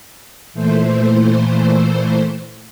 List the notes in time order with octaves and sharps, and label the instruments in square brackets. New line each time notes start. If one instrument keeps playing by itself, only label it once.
[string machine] A#2 E3 A3 C5